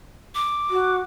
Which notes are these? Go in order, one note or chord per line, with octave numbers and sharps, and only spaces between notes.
D6
F#4